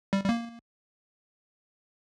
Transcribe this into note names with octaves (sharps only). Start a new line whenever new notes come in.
G3
G3
A#3